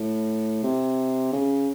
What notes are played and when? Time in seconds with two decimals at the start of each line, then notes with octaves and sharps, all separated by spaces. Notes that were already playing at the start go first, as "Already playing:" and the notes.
Already playing: A2
0.63 C3
1.33 C#3